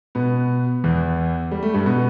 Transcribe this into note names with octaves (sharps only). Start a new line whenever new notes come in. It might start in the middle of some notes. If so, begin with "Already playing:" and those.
B2 B3
E2 E3
G3
A3
G2 G3
B2 B3